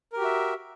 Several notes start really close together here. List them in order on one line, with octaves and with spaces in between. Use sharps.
A#4 G4 F#4 E5